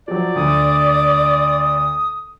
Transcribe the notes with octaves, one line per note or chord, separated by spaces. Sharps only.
F3 F#3 D5
D2 D#6